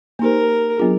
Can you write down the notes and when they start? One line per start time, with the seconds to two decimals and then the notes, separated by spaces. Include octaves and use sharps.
0.19 A#3 D#4 G4 A#4 C5
0.77 F#3 B3 D4 F4 G#4